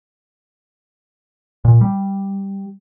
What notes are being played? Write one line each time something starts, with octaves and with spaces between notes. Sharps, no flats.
A#2
G3